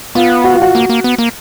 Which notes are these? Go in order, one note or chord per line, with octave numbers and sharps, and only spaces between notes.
B3 F4
F#4
F4
F#4
A#3
A#3
B3
A#3